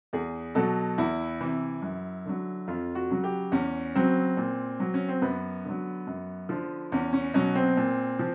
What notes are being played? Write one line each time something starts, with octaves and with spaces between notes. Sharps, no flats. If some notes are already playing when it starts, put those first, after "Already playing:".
E2 G#4
B2 F#3 A4
E2 E4
C3 E3
F#2
D3 F#3
F2 F4
F#4
C#3 F#3
G4
E2 C#4
C#3 F#3 C4
A#2
F#3
C#4
C4
F#2 B3
D3 F#3
F#2
D3 F3
E2 C#4
C#4
B2 F#3 C#4
C4
A#2
F3